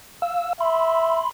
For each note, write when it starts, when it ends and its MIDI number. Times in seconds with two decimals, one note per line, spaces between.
0.22 0.53 77
0.22 0.53 88
0.60 1.22 76
0.60 1.31 83
0.60 1.31 84